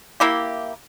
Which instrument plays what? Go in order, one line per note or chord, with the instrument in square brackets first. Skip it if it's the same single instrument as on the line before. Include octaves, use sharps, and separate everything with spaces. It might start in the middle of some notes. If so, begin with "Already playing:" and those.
[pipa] A#3 E4 G4